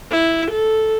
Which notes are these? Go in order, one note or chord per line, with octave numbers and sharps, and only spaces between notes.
E4
A4